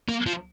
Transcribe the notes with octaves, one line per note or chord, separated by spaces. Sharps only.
A#3
F3